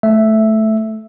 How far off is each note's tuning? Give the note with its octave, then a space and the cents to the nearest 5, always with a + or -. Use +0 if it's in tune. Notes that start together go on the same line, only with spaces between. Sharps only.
A3 -10 E5 +0